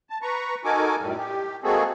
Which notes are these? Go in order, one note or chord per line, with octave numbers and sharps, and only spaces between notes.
A5
B4 A#5 C#6
D#4 F#4 A4 A#4 G#5 D6
F#2 A2 G3
G4
G#3 A#3 C4 F#4 G#4 A4